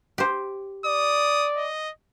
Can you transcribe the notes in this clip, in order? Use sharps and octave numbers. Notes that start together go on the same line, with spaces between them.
G4 C5
D5 D#6
D#5